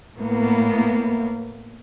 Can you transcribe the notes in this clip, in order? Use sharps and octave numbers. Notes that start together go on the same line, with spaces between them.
A2 A#3 B3